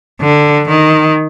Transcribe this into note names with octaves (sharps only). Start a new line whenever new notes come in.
D3
D#3